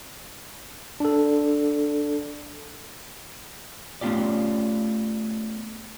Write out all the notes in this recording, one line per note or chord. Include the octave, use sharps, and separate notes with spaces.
D4 A4
A3 B3 C#4 F4 G4 D5